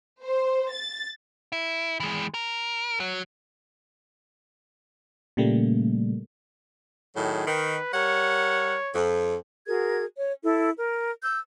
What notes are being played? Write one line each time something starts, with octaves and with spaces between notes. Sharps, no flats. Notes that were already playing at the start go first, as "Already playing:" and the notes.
C5
A6
E4
E3 G#3
A#4
F#3
A#2 C#3 G3 A3 A#3
A2 D#3 F#3 G#4
D#3 B4
G3 A#4 C#5 F#5
F2
F#4 G#4 A#4 G#6
C#5
E4 A4
A#4
E6 G6